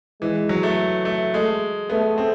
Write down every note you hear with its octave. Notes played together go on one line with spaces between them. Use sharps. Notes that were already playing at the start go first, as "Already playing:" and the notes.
E3 G#3
F#3
A3
A3
G#3 A3
A3 B3
C4